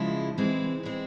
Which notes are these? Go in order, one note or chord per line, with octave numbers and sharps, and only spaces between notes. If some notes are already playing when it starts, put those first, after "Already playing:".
Already playing: C#3 F3 G#3 E4
E3 G#3 C4
E3 G#3 C4